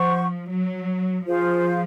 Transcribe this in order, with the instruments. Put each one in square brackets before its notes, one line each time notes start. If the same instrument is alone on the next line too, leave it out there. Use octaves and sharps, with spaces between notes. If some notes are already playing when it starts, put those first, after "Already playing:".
Already playing: [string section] F3 [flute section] C5 F#5 C#6
[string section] F#3
[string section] F3 [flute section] F4 G#4 C5 F5